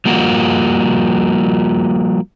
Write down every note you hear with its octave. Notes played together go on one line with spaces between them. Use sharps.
F3 G3 A#3 F4 F#4